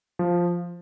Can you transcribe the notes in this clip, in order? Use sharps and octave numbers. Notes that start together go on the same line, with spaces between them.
F3